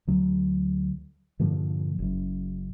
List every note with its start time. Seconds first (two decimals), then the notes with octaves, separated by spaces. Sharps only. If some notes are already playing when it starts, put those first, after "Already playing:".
0.07 D2 F#3
1.39 G2 A#2 D3 F3
1.99 F#1 F#2